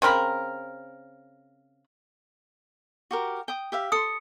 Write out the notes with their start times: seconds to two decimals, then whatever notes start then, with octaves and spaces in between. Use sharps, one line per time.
0.02 C#3 C4 A#4 B5
3.11 F#4 G4 A#4
3.48 G5 D#6
3.72 G4 E5 F5
3.92 A4 C6 D#6 C#7